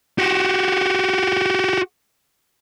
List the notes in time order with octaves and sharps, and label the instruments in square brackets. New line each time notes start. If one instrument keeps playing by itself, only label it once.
[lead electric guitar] F#4 G4